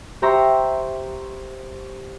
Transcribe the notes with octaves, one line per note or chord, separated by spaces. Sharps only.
G4 C5 E5 A#5 C#6